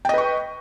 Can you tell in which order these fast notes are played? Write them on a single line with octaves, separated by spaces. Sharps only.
G5 D#5 B4 C#6